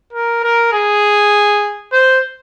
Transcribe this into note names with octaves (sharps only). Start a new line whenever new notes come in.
A#4
A#4
G#4
C5